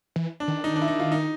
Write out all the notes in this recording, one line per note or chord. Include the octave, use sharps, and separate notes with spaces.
E3
D4
D#3
D#4
D4
E4
D#4
F4
D#4